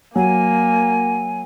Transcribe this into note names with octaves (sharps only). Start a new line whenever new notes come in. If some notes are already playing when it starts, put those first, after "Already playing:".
F#3 A#3 G#5